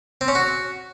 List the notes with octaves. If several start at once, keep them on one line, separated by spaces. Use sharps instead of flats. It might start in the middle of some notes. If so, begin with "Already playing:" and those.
C4
C#4
F#4